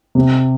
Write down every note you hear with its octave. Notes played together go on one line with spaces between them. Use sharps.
C3